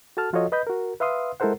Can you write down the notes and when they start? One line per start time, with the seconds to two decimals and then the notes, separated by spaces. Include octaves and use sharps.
0.17 F#4 A4 A5 F6
0.33 F3 F4 F#4 A4 C#5 D#5
0.52 B4 D#5 B5 G6
0.67 F#4 A#4
1.00 B4 E5 F5 C6 D#6
1.40 G#3 E4 A4 A#4 C5 F#5